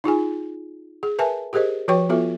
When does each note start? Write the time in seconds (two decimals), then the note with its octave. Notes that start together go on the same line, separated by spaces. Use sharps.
0.04 D#4 F4 G#4 G#5
1.03 G#4
1.18 A#4 B4 E5 G#5 A5
1.53 G4 G#4 A#4 C5 D#5
1.88 F3 F#4 B4 C#5 G5 C#6
2.09 B3 F4 F#4 A4 E5